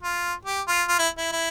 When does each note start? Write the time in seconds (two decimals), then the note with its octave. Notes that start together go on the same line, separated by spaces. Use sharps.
0.03 F4
0.45 G4
0.68 F4
0.88 F4
0.99 E4
1.18 E4
1.32 E4